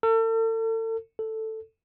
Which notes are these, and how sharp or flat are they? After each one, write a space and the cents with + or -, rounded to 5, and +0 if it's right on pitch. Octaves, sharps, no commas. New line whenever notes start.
A4 +40
A4 +5